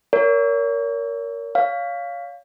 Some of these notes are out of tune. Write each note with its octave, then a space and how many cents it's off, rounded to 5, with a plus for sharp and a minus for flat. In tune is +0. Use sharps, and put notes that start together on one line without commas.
A#4 +0 C#5 +35
C#5 +30 F5 +0